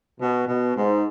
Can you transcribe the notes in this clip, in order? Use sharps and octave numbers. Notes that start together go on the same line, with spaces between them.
B2
B2
G#2